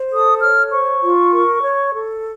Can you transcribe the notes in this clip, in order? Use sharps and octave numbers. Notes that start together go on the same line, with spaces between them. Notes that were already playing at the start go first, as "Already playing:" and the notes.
Already playing: C5
A4 D#6
C#5 F6
C5 C#6
F4
A#4
C#5
A4